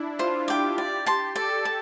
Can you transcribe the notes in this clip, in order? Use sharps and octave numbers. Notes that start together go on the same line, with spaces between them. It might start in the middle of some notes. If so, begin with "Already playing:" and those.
Already playing: D4 E4
F4 C5
G4 G5 D6
D5
A5 C6
A4 D5
A5